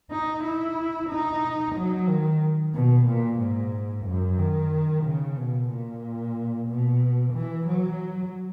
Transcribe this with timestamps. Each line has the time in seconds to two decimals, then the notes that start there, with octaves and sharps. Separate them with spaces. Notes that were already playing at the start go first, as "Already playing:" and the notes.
0.11 D#4
0.44 E4
1.09 D#4
1.75 F#3
2.08 D#3
2.74 B2
3.07 A#2
3.39 G#2
4.06 F#2
4.39 D#3
5.04 C#3
5.37 B2
5.70 A#2
6.68 B2
7.34 E3
7.67 F#3